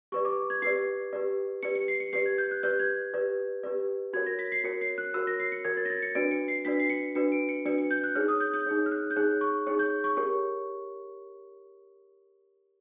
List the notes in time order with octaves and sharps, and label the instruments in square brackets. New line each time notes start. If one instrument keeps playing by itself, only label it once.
[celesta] G4 B4 D5 C#6
D6
G#6
G4 B4 D5 C7
G4 B4 D5
G4 B4 D5 C#7
C#7
C7
C#7
G4 B4 D5 C7
G#6
G6
F#6
G4 B4 D5 G6
G#6
G4 B4 D5
G4 B4 D5
F#4 A#4 C#5 G#6
A#6
B6
C7
F#4 A#4 C#5 C#7
C7
F#6
F#4 A#4 C#5 E6
A#6
C7
C#7
F#4 A#4 C#5 G#6
A6
A#6
A6
C#7
D4 F#4 B4 D5 D7
C#7
C7
D4 F#4 B4 D5 B6
C7
C#7
D4 F#4 B4 D5 C#7
D7
C#7
D4 F#4 B4 D5 C#7
C#7
G6
F#6
D#4 G#4 C#5 F6
D#6
G6
G6
D#4 G#4 C#5
F6
F#6
G6
D#4 G#4 C#5 F#6
C#6
D#4 G#4 C#5
G6
C#6
G4 A#4 C#5 C#6